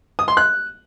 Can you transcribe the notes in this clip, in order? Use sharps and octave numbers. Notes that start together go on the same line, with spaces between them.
D#6
C6
F#6